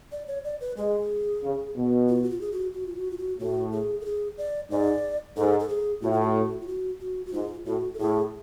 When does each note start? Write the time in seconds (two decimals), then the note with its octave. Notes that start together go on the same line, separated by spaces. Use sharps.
0.12 D5
0.28 C#5
0.44 D5
0.61 B4
0.77 G#3 G#4
1.43 C#3
1.76 B2
2.08 F4
2.24 F#4
2.30 F4
2.41 G#4
2.52 F#4
2.74 F#4
2.86 F4
2.96 F#4
3.11 F4
3.18 F#4
3.39 A2 F#4
3.72 G#4
4.01 A4
4.05 G#4
4.38 D5
4.70 G#2 D5
5.36 G#2 A4
5.60 A4
5.69 G#4
6.02 A2 F#4
6.12 F4
6.22 F#4
6.61 F4
6.67 F#4
7.01 F#4
7.26 F#4
7.33 G#2 F4
7.66 A2 F#4
7.94 A4
7.99 A2 G#4